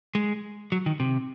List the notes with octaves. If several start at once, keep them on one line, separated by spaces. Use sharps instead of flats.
G#3
F#3
D#3
C3